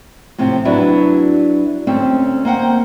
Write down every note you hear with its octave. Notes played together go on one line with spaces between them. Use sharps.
A2 C3 F3 C4
F#3 D4 E4 F#4 B4
D2 C4 C#4 A5
A#3 C5 F#5 G5